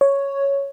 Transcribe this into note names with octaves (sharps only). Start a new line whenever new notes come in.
C#5